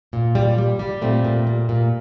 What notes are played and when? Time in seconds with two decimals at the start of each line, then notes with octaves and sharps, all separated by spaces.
0.13 A#2
0.35 G3
0.58 G3
0.79 G3
1.02 A#2 A3 C4
1.24 A#2
1.47 G3
1.69 A#2